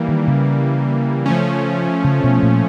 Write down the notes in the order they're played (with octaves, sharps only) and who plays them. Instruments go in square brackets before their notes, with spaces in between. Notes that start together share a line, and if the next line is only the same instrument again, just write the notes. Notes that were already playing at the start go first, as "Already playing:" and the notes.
Already playing: [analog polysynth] E3 G3 A#3
[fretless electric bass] D#3
C#3
[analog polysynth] F3 A3 C#4
[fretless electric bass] C#3
B2
A#2